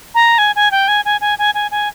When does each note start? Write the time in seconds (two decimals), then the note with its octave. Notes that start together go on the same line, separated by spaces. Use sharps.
0.15 A#5
0.38 G#5
0.56 G#5
0.71 G5
0.88 G#5
1.05 G#5
1.21 G#5
1.39 G#5
1.55 G#5
1.71 G#5